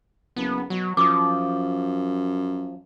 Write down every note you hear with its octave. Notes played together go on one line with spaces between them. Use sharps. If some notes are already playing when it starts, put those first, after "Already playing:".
F#1 B3
B2 F#3
F#2 F3 D6 D#6